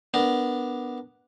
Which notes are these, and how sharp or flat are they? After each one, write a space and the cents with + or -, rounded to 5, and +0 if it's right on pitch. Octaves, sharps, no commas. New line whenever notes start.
B3 +0 D4 +0 A#4 +0